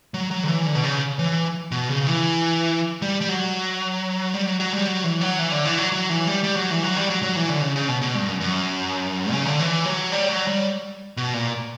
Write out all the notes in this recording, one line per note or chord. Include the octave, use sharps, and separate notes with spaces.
F#3
F#3
D3
E3
D3
B2
C#3
E3
B2
C#3
E3
G3
G3
F#3
G3
F#3
F#3
G3
F#3
E3
F#3
E3
D3
E3
F#3
F#3
E3
G3
G3
F#3
E3
F#3
G3
F#3
F#3
E3
D3
C#3
C#3
B2
B2
G2
F#2
F#2
C#3
D3
E3
F#3
G3
F#3
G3
B2
A#2